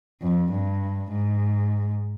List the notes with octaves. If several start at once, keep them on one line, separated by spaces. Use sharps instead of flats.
F2
G2
G#2